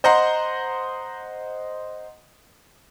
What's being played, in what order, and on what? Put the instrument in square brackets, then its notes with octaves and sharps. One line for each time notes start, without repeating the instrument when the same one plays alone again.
[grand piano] C5 D#5 F#5 A#5 C6